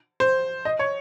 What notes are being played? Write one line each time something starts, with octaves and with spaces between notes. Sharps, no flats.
C5
D#5
C#5